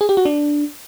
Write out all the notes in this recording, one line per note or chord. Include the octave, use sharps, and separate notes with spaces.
G#4
G4
F#4
D4